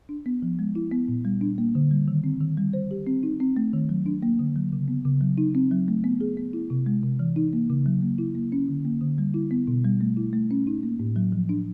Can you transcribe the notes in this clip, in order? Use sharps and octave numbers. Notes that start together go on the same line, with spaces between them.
D4
B3
F3
G#3
E4
B3
A#2
G3
D4
A#3
D3
G3
D#3
C4
D#3
G3
C5
G4
C4
D#4
C4
A3
D#3
F#3
D4
A#3
D3
F#3
C#3
B3
C#3
F#3
D#4
C4
F#3
A3
B3
G#4
B3
E4
C3
G#3
C3
E3
D#4
A#3
C#3
F#3
A#3
E4
A#3
C#4
D3
A#3
D3
G3
E4
B3
B2
G3
A3
E4
A3
C#4
D#4
A#3
A2
F#3
F3
D4